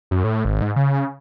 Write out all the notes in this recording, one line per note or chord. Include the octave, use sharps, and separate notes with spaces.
F#2
A2
G#1
G#2
C#3